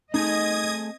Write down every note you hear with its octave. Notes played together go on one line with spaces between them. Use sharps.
A3 C4 D#4 G#4 D#5 D#6 G#6